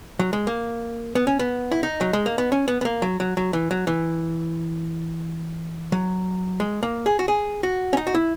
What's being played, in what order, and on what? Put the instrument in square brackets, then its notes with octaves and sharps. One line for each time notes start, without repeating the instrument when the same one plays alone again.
[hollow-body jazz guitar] F#3
G#3
A#3
B3
C#4
B3
E4
D#4
F#3
G#3
A#3
B3
C#4
B3
B3
A#3
F#3
F#3
F#3
E3
F#3
E3
F#3
G#3
A#3
G#4
F#4
G#4
F#4
C#4
D#4
F#4
E4